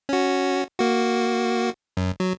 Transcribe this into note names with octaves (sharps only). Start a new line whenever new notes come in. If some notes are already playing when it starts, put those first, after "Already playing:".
C#4 F#4
A#3 F#4
F#2
F#3